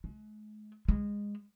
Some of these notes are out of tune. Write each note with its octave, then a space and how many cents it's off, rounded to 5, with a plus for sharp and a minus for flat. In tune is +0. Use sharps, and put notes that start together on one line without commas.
G#3 +45
G#3 -15